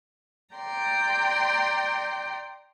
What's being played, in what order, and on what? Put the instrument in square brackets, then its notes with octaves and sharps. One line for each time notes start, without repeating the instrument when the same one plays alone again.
[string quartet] D5 G5 A#5 C6